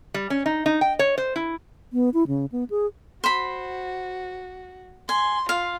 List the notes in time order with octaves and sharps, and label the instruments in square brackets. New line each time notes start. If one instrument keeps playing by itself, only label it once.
[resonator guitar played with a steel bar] G3
C#4
D#4
D#4
G5
C#5
C5
E4
[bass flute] B3
E4
C#3
B3
G#4
[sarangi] F#4 [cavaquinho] C5 B5
[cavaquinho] G#5 [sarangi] C6
[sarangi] F4 [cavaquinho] F5